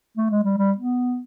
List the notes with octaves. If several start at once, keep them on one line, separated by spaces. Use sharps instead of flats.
A3
G#3
G3
G3
B3